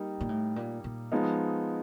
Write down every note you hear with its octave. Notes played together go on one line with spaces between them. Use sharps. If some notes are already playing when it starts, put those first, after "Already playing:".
Already playing: G3 A#3 D#4
A#2
A2
A#2
A#2
F3 G#3 B3 D#4